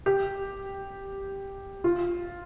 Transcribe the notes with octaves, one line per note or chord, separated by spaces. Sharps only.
G4
F4